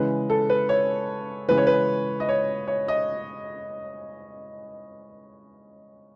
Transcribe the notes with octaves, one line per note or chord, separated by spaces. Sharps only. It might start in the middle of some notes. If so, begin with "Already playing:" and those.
Already playing: C#3 E3 G#3 B4
A4
B4
C#5
C#3 E3 G#3 B4
C#5
B4
D#5
C#5
C#5
D#5